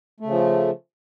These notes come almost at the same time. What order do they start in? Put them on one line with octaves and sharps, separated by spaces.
A3 C#3 F3